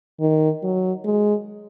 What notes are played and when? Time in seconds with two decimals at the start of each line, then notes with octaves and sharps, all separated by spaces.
0.20 D#3
0.63 F#3
1.05 G#3